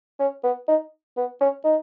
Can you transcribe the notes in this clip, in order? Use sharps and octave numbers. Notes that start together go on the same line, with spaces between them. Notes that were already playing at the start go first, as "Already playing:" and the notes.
C#4
B3
D#4
B3
C#4
D#4